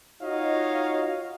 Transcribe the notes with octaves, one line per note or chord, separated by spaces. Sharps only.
D#4 F4 F#4 C#5 D#5 F5